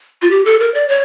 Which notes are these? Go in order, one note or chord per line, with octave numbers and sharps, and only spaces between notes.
F4
G4
A4
A#4
D5
C#5